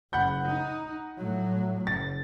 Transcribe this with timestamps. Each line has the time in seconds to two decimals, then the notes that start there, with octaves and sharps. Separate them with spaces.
0.13 F#1 F#5 B5 G6
0.46 D#4
1.17 A2 F#3
1.87 F#1 A6